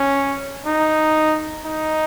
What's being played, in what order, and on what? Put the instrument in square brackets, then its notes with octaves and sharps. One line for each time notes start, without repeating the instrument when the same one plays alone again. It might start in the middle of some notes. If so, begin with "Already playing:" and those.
Already playing: [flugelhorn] C#4
D#4
D#4